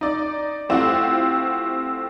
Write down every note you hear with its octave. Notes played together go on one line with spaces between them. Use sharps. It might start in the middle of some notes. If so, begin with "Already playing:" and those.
D#4 D5
A3 C4 E4 F4 G4 F#5